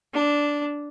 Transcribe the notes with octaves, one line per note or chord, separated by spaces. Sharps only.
D4